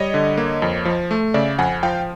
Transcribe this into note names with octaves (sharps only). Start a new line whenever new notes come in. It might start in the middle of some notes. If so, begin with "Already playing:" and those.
Already playing: G3 C#5 D#5
D3
A#3
F2
F3
A3
C#3 D5 E5
F2 F#5 G#5
F3 F5 G5